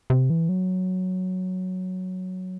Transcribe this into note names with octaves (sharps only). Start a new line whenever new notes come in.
C3
E3
F#3